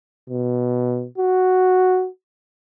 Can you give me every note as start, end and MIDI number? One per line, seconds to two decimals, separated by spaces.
0.30 1.06 47
1.18 2.08 66